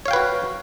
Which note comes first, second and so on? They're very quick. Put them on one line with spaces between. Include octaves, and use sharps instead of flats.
C#5 F5 G5 B4 F#4